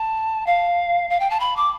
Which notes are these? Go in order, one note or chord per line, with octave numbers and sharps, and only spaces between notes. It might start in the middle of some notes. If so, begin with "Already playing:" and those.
Already playing: A5
F5
F5
G5
A5
B5
D6